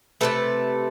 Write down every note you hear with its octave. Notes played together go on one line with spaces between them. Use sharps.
C3 F3 A3 A4 B4